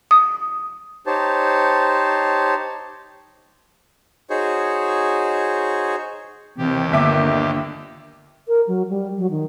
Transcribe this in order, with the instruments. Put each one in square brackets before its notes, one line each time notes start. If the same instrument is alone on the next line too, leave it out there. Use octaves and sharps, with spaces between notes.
[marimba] D#6
[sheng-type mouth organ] D#4 G4 C5 C#5 A5
D#4 F#4 G#4 C5 C#5
[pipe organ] D#2 G4 [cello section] C3 E3
[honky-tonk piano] G1 E5 D6 [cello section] D3 A#3
[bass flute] A#4
F#3
G3
F#3
D#3